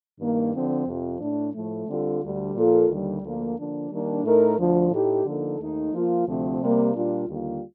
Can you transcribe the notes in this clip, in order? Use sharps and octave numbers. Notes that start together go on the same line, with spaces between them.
G2 D#3 A#3
D3 F3 C4
F2 C3 F3
A2 A3 D4
A2 F3 A3
D3 G3 C4 F4 A4
D2 D3 G3
A#2 F3 A#3 F4 A4
D#2 D3 G3
D2 D3 F3 A#3
D3 F3 A#3 D4
D#3 G3 A#3 D4
A2 A3 D#4 A#4
D2 D3 F3
A2 A3 D#4 G4
D3 F3 A#3 D#4 A4
D#2 D#3 A3 D#4
F3 A#3 F4
D2 C3 F3 A3 C4
C3 G3 A#3
A#2 G3 D4 F4
D#2 D3 G3 A#3 F4